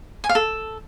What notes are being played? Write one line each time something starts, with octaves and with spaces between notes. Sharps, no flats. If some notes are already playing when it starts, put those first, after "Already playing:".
G#5
F5
A4